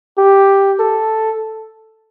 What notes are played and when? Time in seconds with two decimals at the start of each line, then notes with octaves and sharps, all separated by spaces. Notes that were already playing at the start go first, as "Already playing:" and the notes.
0.18 G4
0.80 A4